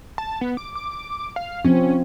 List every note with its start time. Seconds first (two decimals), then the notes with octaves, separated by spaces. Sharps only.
0.18 A5
0.41 B3
0.57 D6
0.75 D6
1.36 F5
1.65 F3 C4 C#4